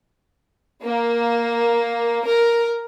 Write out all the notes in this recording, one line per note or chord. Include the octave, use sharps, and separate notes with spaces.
A#3
A#4